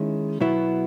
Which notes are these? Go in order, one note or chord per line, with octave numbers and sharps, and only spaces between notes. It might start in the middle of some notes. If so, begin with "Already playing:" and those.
Already playing: D#3 G#3 C#4 E4
B2 F#3 B3 E4